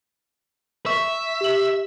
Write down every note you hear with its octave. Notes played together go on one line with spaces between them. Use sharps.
E5 C#6 B6
G4 F#7